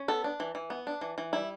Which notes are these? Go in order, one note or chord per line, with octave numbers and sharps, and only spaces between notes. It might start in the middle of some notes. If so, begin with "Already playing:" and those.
Already playing: C#4
B3 A4
D4
E3
E3
B3
D4
E3
E3
G3 E4